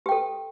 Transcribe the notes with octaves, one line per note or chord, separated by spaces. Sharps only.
G4 A4 G5